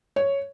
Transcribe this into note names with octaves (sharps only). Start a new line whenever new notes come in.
C#5